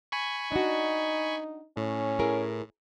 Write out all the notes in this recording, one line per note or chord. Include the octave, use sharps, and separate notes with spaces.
G#5 B5 C#6
D4 D#4 F#4
A2 C#4
E4 G#4 A#4